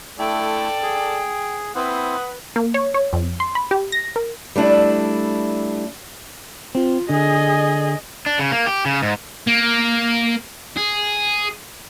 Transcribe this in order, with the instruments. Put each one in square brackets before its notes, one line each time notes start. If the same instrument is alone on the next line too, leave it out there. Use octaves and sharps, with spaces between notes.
[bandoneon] A3 E4 [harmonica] A4 D5 [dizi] G5
[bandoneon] G#4
[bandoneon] C4 E4 C5 [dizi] B4 [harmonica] F#5 D#6
[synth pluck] A#3
C#5
C#5
F2
C6
B5
G4
A#6
A#4
[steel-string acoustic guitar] G3 A3 D4 E4
[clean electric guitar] C4 [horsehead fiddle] F4
[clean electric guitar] D3 [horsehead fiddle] G#4 D#5
[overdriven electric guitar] D4
C#3
A#3
G4
C#3
G#2
[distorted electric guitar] A#3
G#4